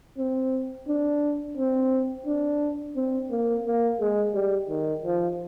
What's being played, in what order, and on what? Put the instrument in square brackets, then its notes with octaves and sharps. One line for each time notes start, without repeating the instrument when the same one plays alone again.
[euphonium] C4
D4
C4
D4
C4
A#3
A#3
G#3
G3
D#3
F3